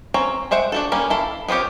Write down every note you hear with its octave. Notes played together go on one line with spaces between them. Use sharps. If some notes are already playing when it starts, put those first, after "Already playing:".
C4 C#4 C#5 A#5
G#3 C5 E5 F#5 G5
D4 F#4 A4
G3 A#3 C#4 D#4
E4 A4 F5
B3 C4 F4 G4 C#5